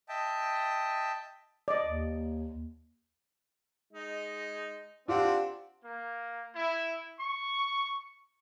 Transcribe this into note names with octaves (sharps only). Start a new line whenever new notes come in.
D#5 E5 G5 A5
D5 D#5
D#2
G#3 D#4
C4 D4 F4 G4 D5 F#5
A#3
E4
C#6